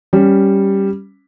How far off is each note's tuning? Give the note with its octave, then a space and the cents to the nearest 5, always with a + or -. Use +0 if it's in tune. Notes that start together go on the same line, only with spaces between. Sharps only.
G3 +0 C#4 +0